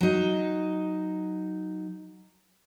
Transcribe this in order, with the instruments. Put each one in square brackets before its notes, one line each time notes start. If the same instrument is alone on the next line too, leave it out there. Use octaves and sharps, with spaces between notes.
[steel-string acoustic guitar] F#3 D#4